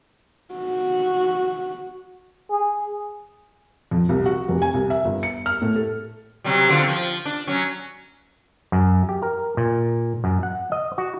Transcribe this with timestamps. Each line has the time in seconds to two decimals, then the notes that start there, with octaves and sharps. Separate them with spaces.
0.54 F#4
2.51 G#4
3.91 F2
4.09 C2
4.26 F#4
4.48 F1
4.62 G#5
4.74 C2
4.90 E5
5.05 G1
5.23 C#7
5.46 F6
5.62 A2
5.76 A4
6.44 C3 F#3 G3
6.69 D3 C4 F4
6.87 F3
7.25 D4
7.47 F#3 C#4
8.72 F#2
9.09 G4
9.22 A#4
9.57 A#2
10.24 F#2
10.43 F#5
10.72 D#5
10.98 F#4